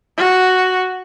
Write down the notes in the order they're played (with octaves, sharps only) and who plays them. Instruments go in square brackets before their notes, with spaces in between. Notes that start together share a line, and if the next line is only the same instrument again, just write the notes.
[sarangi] F#4